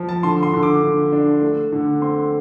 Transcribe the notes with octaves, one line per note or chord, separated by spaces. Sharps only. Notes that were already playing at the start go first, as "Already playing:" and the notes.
Already playing: F3
A5
D3 C6
C6
D3
D6
D3
D4
A3
D3
C4 C6